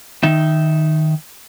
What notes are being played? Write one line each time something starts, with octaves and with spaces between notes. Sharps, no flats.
D#3 D#4 E5